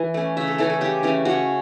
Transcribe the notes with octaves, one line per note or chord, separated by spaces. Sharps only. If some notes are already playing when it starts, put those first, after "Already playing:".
Already playing: E3
A3 C#4
C#3 E5
A4
E3 A3 C#4 A4
A4
C#3 G4
E3 A3 C#4
C#3 F#4